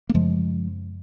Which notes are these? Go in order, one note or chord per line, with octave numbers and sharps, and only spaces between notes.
A#3
F#2 C#3 F3 G#3